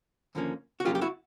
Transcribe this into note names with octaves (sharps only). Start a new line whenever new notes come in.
D#2 D3 F3 A#3 C#4
F#4
F2 C#3 F#3 A#3 F4 G4
G4
E4 F#4